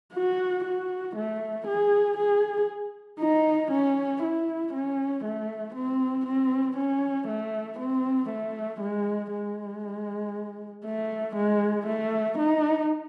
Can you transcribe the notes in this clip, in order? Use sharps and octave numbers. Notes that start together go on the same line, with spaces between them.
F#4
F#4
A3
G#4
G#4
D#4
C#4
E4
C#4
A3
C4
C4
C#4
A3
C4
A3
G#3
G#3
A3
G#3
A3
D#4